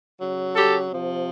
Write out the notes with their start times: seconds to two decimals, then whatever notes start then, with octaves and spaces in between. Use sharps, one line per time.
0.20 C#3 F#3
0.55 G4 A4
0.90 C3 F3